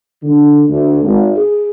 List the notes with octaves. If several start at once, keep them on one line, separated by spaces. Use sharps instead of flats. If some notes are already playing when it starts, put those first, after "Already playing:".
D3
D2
G#1
G#4